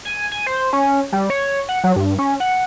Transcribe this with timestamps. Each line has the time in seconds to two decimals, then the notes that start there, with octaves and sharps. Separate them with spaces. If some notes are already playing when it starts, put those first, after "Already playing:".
0.05 G#5
0.32 G#5
0.47 C5
0.73 C#4
1.12 G3
1.30 C#5
1.69 F#5
1.84 F#3
1.96 G2
2.19 C#4
2.40 F#5